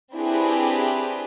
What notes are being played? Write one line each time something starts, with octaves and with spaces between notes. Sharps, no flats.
C4 D4 E4 G4 G#4 B4